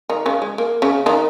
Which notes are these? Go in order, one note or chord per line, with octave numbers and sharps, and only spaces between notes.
D#3 D#4
C#3 C#4
G#3
A#3
C#3 C#4
D#3 D#4